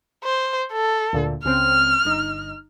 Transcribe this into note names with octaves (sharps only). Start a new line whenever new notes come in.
C5
A4
D2 A#2 D3
C#2 C#3 C4 F6
G1 D#4